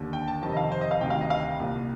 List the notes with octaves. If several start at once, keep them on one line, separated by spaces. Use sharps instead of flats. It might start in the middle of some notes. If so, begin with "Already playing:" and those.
Already playing: D#2 D3
G5
A5
F2 C3 D#3 A5
D#5
F5
C5
D#5
F5
D2 C3 D#3 G5
F5
D#5
F5
G5
C2 A#2